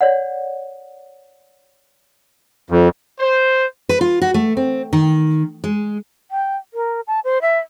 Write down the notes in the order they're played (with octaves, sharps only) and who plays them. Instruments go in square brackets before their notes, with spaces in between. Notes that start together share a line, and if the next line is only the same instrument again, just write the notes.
[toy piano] C#5 D5 F#5
[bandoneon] F2
[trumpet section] C5
[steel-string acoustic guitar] B4
F4
F#4
A3
C4
D#3
G#3
[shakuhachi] G5
A#4
A5
C5
E5